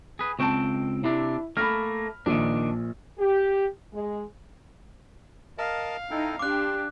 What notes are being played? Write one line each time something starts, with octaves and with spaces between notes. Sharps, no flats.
G#4 B4
C#2 C4 G5 A5 C#6
C3 D4 E4
A3 A#3 B5 F6
A#1 A#2 D#3 D4
G4
G#3
A#4 D#5 F5 A5
D#4 E4 A4 G5
D4 G4 C6 D6 F#6